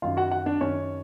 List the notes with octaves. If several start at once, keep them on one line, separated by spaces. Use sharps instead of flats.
F#2 D#3 F4 F5
F#4 F#5
F#4 F#5
D4 D5
F#2 D#3 C#4 C#5